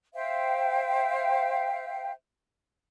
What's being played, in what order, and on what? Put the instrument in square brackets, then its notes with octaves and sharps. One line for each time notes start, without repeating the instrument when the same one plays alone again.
[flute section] C5 E5 F5 G5